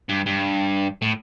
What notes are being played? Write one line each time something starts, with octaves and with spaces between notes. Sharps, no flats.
G2
G2
A2